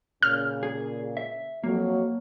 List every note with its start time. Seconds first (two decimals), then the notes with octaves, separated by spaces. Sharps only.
0.23 A#2 C#3 F6
0.63 G#4
1.17 E5
1.64 F2 F#3 A#3